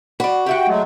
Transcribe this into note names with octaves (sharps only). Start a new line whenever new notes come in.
F#4 D5 B5
G4 E5 F#5 G5
F#3 G#3 A3